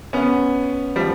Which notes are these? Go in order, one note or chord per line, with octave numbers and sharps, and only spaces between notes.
B3 C#4
F3 G3